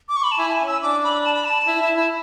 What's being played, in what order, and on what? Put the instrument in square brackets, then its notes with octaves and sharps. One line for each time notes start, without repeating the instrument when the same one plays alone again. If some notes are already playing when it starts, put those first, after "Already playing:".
[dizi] D6
C#6
B5
A5
[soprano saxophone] E4 [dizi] G#5
[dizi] A5
G#5
[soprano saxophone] C#4
[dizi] E6
[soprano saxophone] D4 [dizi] D6
[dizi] B5
A5
B5
A5
[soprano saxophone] E4
E4
E4